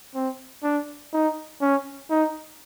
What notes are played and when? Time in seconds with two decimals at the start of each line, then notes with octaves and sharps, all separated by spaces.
0.15 C4
0.63 D4
1.13 D#4
1.61 C#4
2.10 D#4